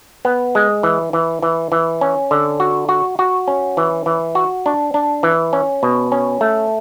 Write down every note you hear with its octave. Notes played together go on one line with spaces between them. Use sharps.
B3
G#3
E3
E3
E3
E3
C#4
D3
F#4
F#4
F#4
C#4
E3
E3
F#4
D4
D4
E3
C#4
B2
C#4
A3